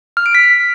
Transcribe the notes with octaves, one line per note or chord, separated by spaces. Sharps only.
F6
D7
B6